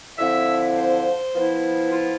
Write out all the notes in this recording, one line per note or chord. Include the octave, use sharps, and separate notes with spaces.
D3 F3 C4 E4 E5
C5
F3 B3 E4
F4